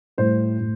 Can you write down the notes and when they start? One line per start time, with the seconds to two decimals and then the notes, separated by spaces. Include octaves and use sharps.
0.18 A2 G3 C5
0.60 A2